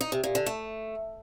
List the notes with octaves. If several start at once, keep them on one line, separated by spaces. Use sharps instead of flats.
D#4
C3
A#2
D3
A3